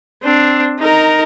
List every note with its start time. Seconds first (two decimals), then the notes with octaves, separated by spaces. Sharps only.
0.22 C4 D4
0.79 D#4 A#4